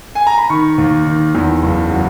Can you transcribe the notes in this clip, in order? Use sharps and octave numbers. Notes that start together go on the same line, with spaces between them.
G#5
A#5
B5
D#3 C#6
D#2
D#3
E2
F#1
F#3